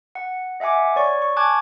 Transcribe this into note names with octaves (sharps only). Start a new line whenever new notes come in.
F#5
D#5 E5 F#5 G#5 D6
C#5 D5 C#6
C#6
G#5 A5 C#6 D6 F#6 G#6